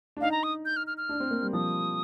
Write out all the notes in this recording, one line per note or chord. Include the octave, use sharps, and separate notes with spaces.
D4
D#4 F5
A#5
D#6
G6
F6
F6
F6
D4
C4
A#3
G3
F3 D#6